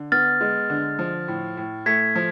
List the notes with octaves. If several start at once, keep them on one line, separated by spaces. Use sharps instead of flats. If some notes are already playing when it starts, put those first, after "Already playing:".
Already playing: D3
B3 F6 A6
G#3
D3
F3
A2
A2
A3 G#6 B6
F3